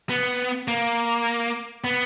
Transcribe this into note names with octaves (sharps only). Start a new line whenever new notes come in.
B3
A#3
B3